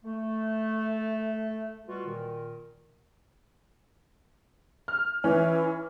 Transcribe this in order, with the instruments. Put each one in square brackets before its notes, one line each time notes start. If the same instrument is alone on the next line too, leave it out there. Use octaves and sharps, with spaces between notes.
[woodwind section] A3
B2 G3 F4 F#4
A#2 D#3
[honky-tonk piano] F6
[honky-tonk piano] E3 C#4 [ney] E4